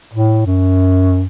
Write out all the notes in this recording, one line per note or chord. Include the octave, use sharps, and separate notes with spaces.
A2
F#2